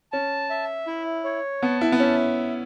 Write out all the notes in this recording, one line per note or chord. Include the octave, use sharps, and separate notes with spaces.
C#4 A5
E5
E4
C#5
B3 A5
E4
B3
C#4 E5